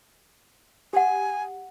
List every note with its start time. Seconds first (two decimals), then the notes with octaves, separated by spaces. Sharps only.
0.93 G4 F#5 G#5